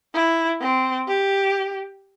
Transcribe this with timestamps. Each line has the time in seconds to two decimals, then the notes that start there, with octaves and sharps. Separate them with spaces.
0.14 E4
0.61 C4
1.08 G4